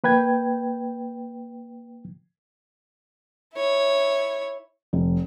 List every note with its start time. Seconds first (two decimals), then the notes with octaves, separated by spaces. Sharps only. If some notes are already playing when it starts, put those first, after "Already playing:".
0.04 A#3 B4 G5 G#6
3.55 E4 C#5
4.93 F1